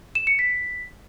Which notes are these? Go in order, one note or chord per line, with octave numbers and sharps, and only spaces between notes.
E7
C#7
B6